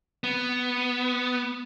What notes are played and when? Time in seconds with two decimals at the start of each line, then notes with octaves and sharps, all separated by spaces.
0.24 B3